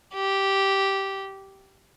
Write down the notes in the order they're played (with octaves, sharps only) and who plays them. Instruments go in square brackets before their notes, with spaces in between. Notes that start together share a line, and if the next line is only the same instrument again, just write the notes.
[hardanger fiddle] G4